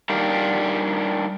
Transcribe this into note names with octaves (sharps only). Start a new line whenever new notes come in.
G3 D4 D#4 G4 A#4 F5